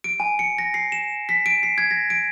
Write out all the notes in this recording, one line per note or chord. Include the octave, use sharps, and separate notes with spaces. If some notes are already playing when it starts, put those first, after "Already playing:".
D7
G#5
C#7
A#6
C7
E7
B6
D7
C7
G#6
A#6
D7